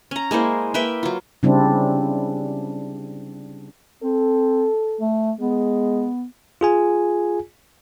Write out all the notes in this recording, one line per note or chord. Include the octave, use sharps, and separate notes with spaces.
C#4 A#5
G#3 A#3 E4 C5
A#3 B4 E5 G5
F#3 F4
C#3 G3 C4 D4 E4
C4 A4
A3
G#3 B3
F4 G#4 G#5